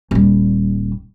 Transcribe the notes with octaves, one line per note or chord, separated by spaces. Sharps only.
D#1 G3